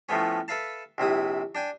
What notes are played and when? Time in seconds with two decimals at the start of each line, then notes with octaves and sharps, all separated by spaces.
0.09 A2 F3 A3 B3 C#4
0.48 A4 B4 E5 F5 A5
0.98 A#1 C3 E4 D#6
1.55 D4 G5 G#5